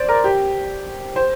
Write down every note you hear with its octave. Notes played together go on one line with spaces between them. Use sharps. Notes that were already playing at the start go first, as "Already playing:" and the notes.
Already playing: C5 D5
A#4
G4
C5